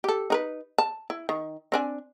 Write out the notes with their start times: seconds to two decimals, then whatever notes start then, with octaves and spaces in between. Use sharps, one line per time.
0.04 G4 A4
0.30 D#4 A#4 B4
0.78 A5
1.10 E4
1.29 D#3
1.72 C4 D4 G#5